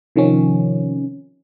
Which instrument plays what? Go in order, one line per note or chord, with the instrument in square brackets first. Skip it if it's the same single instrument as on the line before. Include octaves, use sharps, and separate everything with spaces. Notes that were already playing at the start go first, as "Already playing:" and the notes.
[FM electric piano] C3 D#3 F3 C#4